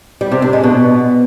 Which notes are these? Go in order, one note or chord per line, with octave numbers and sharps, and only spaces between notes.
G3
C3
D4
G#3
B2